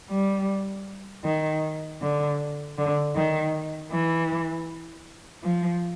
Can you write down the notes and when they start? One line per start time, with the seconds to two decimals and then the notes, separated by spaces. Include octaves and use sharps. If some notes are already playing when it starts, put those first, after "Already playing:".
0.10 G3
1.25 D#3
2.01 D3
2.77 D3
3.15 D#3
3.92 E3
5.43 F3